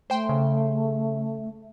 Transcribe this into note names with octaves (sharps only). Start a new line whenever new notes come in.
A3 C5 G5 C6
C#3